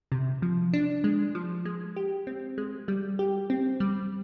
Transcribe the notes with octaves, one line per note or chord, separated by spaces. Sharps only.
C3
F3
D4
G#3
F3
G#3
G4
C4
G#3
G3
G4
C4
G3